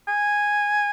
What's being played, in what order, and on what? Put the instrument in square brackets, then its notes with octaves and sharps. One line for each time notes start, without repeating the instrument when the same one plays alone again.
[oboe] G#5